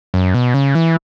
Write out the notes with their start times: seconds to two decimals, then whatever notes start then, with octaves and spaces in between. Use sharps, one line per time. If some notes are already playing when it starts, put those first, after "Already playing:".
0.14 F#2
0.34 B2
0.54 C#3
0.75 E3